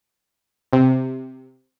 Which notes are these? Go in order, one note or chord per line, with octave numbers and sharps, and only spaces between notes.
C3